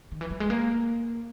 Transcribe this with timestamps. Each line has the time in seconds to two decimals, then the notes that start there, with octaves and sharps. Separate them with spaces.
0.12 D#3
0.21 E3
0.31 F#3
0.40 G#3
0.50 A#3